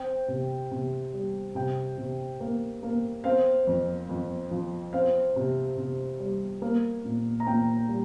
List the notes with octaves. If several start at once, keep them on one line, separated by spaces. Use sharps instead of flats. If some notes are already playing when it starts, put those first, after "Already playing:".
Already playing: C4 G5
C3
C3
G3
C3 G5
C3
A#3
A#3
C4 F5
F2
F2
F3
C4 F5
C3
C3
G3
A#3
A#2
A#5
A#2 G5
G3